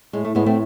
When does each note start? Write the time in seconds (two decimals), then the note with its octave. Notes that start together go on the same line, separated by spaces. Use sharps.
0.13 A2 G#3
0.24 A3
0.35 A2 G#3 B3
0.46 A3 C4